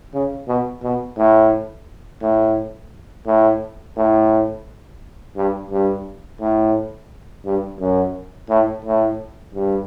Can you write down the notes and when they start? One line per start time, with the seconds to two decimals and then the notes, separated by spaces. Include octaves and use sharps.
0.14 C#3
0.48 B2
0.83 B2
1.17 A2
2.22 A2
3.27 A2
3.97 A2
5.36 G2
5.71 G2
6.41 A2
7.45 G2
7.81 F#2
8.49 A2
8.85 A2
9.55 G2